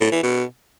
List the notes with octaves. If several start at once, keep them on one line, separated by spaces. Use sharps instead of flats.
A2
E3
B2